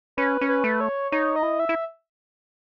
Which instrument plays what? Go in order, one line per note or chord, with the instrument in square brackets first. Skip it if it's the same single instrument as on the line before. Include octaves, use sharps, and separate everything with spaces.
[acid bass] C#4 [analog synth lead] B4
[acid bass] C#4
[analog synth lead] B4
[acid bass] A3
[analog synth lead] C#5
[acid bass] D#4 [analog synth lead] C#5
[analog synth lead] D#5
[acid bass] E4
[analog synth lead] E5
[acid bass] E4